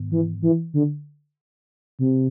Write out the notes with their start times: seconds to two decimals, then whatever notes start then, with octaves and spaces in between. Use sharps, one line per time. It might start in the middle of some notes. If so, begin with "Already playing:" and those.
Already playing: G#2 D#3 B3
0.11 E3
0.42 E3
0.74 D3
1.99 C3